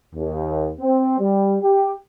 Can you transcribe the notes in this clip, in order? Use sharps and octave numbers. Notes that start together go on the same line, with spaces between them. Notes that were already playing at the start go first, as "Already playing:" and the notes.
D#2
C4
G3
G4